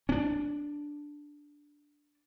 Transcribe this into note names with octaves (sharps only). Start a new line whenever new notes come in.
C#4 D4